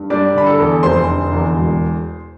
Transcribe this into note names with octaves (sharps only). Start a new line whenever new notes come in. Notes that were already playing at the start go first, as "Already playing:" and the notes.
Already playing: G2
G3 D4 D5
D3 B5
A4 A5
E2
F1 C5 C6
D3
E2
E1